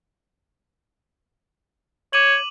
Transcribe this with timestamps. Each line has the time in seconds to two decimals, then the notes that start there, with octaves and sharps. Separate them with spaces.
2.13 C#5 D6 D#7 F#7